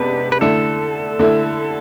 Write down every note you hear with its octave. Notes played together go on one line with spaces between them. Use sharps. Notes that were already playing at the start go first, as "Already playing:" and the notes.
Already playing: C3 G#3 B3 D4 B4
B4
D3 A3 E4 A4
D3 A3 E4